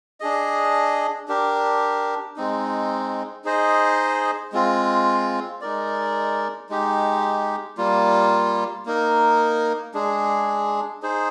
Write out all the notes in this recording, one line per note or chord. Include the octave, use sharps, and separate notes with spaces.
D4 G#4 D#5
D4 G4 A#4
G#3 C4 D#4
D#4 G#4 C5 D#5
G#3 C4 F4
G#3 D#4 A#4 D5
G#3 D#4 G4
G3 A#3 F4
A#3 D#4 A#4
G#3 D4 G#4
D#4 G#4 C5